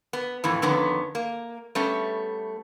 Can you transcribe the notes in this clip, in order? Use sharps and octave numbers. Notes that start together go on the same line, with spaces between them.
B3
F2 A2 E3
F2 D3 D#3 B3 C#4
A#3
G3 A3 B3 C#4